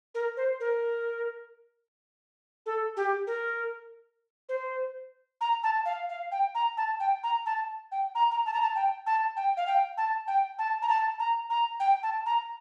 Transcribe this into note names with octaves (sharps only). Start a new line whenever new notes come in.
A#4
C5
A#4
A4
G4
A#4
C5
A#5
A5
F5
F5
G5
A#5
A5
G5
A#5
A5
G5
A#5
A#5
A5
A#5
A5
G5
A5
G5
F5
G5
A5
G5
A5
A#5
A5
A#5
A#5
G5
A5
A#5